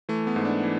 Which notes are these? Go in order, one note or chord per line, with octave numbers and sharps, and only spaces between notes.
E3 A3
B3
G#2
D4
E3